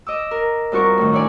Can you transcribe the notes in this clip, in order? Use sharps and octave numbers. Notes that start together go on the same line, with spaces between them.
D#5 D6 E6
A#4
G2 C4 F4 F#4 A#4 C#6
A2 D#3
D4 E4 C#5 D5 G#5